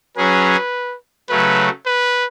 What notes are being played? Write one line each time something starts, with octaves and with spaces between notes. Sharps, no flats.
F#3 C#4 G#4 B4
C#3 F#3 A3 B4
B4